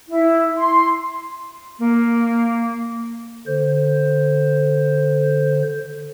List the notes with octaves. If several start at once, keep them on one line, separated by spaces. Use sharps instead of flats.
E4
C6
A#3
D3 C5